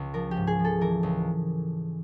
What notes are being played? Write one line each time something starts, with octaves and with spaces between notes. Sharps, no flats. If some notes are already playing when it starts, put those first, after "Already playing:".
Already playing: C#2
F3 A#4
G4
G#2
G#4
F3
A4
E3 A#4
C#2